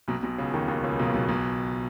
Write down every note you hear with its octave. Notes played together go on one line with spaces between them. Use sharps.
B1 B2
B1 B2
C#2 C#3
D#2 D#3
D#2 D#3
C#2 C#3
B1 B2
B1 B2
B1 B2